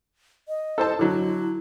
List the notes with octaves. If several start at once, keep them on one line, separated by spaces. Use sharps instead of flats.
D#5
A4 C5 A5
D3 F#3 E4